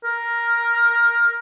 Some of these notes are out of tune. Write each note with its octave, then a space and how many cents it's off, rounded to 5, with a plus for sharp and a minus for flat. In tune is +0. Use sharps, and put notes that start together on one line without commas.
A#4 +5